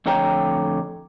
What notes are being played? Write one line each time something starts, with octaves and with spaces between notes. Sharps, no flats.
F2 A2 D3 C#5 G5 A#5